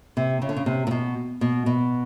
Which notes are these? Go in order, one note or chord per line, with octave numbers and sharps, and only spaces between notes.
C3
C#3
D3
C#3
C3
A#2
B2
B2
B2